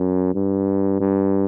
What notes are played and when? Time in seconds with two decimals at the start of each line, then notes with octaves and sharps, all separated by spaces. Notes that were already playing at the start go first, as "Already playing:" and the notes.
Already playing: F#2
0.35 G2
1.00 G2